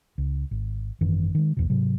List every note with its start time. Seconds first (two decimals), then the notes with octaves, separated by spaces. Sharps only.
0.18 C#2
0.51 G#1
1.01 G#1 F#2 D#3 E3
1.35 D#3 G#3
1.57 A#1 E2 B2
1.70 G#2 C3 F#3